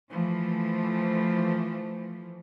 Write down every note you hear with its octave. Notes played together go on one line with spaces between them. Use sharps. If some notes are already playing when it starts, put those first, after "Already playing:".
E3 F3 A3